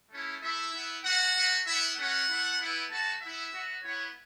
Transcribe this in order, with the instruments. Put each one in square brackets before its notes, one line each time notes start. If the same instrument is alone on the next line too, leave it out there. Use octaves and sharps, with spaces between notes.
[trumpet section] A3 C#4 E4
A3 E4 E5
B3 E4
A3 F#4 F#5
A3 F#4
B3 E4 E5
A3 C#4 F#4 F#5
A3 E4
B3 E4
A3 F#4 A5
B3 E4 E5
B3 F#4
B3 E4 C#5